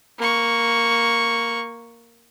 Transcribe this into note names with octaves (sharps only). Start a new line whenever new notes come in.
A#3 C#6